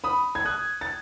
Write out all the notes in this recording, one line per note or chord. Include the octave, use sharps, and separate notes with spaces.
B5 D#6
G#6
D#6 F#6
A6